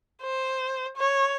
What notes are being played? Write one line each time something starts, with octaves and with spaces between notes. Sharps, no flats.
C5
C#5